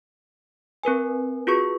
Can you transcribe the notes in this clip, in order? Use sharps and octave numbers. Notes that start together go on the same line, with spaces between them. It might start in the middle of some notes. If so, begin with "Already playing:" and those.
C4 A#4 B4 G#5
F4 F#4 G#4 B4 C#6